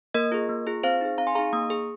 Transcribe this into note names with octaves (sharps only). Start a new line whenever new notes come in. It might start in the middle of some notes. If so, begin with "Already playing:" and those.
A#3 A#4 D#5
F4 G#4
A#3
F4 G#4
C4 C5 F5
D#4 G#4
C4 F5 A#5
G#5 C6
D#4 G#4 F5 A#5
A#3 A#5 D#6
G#4